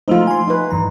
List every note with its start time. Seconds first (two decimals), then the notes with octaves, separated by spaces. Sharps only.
0.08 F3 A3 D#4 F4 C5
0.27 G#5 C6
0.48 D#4 B4
0.71 G2 E3 A#5